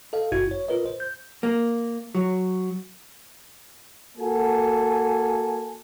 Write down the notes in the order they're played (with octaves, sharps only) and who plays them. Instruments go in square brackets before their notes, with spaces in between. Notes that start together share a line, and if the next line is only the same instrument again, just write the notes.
[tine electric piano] A4 D#5 F5
G1 F#2 E4 F#4 G#6
C#5
F4 A#4 B4 D#5
C5
G6
[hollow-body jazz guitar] A#3
F#3
[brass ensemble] A#3 F#4 A4 G#5